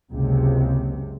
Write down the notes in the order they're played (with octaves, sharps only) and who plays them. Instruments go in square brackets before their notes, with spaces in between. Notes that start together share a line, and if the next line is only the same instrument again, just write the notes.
[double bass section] F#1 C#2 C3